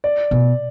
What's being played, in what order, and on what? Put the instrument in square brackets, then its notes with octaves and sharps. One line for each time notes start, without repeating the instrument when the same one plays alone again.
[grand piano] D5
[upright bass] B2